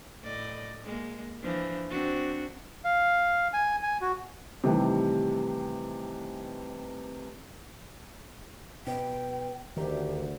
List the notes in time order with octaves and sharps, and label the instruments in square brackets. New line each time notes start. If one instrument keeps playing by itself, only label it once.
[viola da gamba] A2 D5 D#5
G#3 A#3
E3 F3 D4
C4 D4 F#4
[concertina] F5
G#5
G#5
F#4
[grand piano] C3 D#3 E3 G3 A3
[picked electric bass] B2 [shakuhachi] G5
[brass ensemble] D2 [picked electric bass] D#3 [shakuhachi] G4